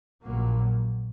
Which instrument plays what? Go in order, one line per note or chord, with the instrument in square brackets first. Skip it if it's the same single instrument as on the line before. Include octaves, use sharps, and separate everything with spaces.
[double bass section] A#1 A#2 F#3 A#3